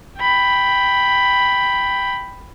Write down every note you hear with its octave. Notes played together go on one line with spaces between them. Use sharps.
G5 B5